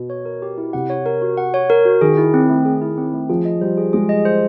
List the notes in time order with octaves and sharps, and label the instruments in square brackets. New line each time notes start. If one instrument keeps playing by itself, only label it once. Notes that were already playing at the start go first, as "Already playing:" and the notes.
Already playing: [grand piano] B2
[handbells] C#5
A#4
G4
E4
[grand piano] C3 [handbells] F#5
[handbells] C#5
A#4
F#4
F#5
C#5
A#4
F#4
[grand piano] D#3 [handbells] G#4
[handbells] E4
C4
A3
G#4
E4
C4
A3
[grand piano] F3 [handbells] G#4
[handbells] D#5
[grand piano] G3 [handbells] C5
[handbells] G#4
[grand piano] G#3 [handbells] G#4
[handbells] D#5
C5